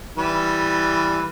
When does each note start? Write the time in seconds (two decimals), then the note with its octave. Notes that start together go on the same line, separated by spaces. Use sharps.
0.17 E3 G3 B4